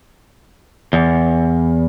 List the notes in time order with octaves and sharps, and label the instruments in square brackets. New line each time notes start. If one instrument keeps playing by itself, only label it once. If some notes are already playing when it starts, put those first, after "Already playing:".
[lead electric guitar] E2